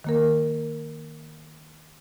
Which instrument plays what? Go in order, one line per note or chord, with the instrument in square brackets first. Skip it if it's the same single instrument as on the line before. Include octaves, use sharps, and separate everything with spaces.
[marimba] D#3 A#3 A#4